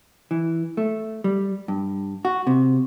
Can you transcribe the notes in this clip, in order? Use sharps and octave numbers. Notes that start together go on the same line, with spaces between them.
E3
A3
G3
G2
F#4
C3